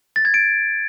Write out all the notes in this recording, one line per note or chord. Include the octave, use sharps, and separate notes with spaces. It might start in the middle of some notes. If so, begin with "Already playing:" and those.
A6
G#6
D7